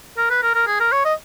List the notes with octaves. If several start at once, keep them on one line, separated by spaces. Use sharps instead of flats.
A#4
B4
A#4
A#4
G#4
A#4
C#5
D#5